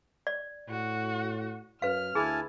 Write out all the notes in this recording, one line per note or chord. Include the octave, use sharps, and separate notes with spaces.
D5
A2 F#4
F#2 B4 F5 F6
D2 E4 G#4 G#5 A5